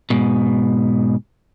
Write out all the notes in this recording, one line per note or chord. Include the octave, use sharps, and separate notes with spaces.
G#2 B2